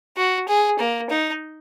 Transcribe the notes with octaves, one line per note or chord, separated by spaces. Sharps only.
F#4
G#4
A#3
D#4